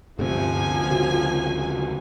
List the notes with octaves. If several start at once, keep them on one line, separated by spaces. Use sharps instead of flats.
D2 G2 C3 F3 G#5
C#3 F#4